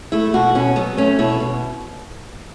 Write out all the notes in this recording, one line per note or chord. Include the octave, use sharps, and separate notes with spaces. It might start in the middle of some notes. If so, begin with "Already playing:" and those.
A3 E4
B2 F#4
B2 C#4
F#3 B3
A3 C#4
B2 E4
B2